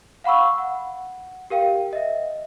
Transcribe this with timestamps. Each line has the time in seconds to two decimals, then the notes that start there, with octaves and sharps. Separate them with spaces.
0.24 F5 F#5 B5 C#6 E6
0.58 F#5
1.50 G4 A#4 F5 G5
1.93 D#5 E5